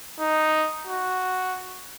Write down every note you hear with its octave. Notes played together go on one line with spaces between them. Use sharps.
D#4
F#4